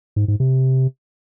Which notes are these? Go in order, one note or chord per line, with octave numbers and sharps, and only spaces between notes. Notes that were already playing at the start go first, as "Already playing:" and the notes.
G#2
G#2
C3